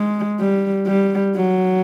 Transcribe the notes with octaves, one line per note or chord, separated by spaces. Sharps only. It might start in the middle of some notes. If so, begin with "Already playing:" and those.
Already playing: G#3
G3
G3
F#3